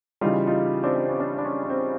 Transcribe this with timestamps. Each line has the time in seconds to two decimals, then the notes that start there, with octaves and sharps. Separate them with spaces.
0.21 C#3 E3 G3 D#4 F4
0.47 D#4 F4
0.83 C4 D4
0.96 C4
1.08 C#4
1.19 C4 D4
1.38 D4
1.45 C#4
1.63 C#4
1.69 C4